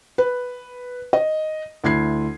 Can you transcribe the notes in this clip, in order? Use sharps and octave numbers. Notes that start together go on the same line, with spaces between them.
B4
D#5
D2 E4 G#6 C7